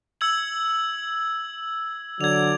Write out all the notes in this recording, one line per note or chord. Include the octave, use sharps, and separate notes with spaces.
E6 G#6 F#7
D3 F#3 D5 G#6 F7